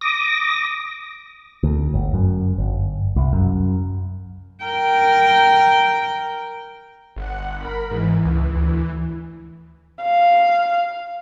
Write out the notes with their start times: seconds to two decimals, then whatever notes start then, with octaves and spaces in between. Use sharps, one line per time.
0.01 D6 D#6 A#6
1.63 D2
1.94 G1
2.14 F#2
2.58 G1
3.16 C2
3.33 F#2
4.64 A#4 G5
7.16 G1 F#5
7.57 A#4 B5
7.91 G#2 E3
8.25 C#2
8.56 D2
10.02 F5